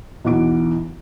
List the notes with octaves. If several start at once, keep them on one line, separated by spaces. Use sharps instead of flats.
B1 E2 E3 F#5 D6 D7